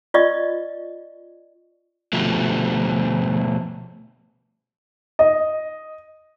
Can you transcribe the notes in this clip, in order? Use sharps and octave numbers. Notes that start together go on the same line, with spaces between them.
F4 D5 D#5 C#6
B2 F3 A3
D#5